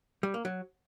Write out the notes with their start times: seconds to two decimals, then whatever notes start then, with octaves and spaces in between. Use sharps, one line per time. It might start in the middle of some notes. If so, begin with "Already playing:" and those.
0.23 G3
0.34 A#3
0.45 F#3